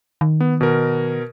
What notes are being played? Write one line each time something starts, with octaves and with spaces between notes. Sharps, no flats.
D#3
B3
B2 A#4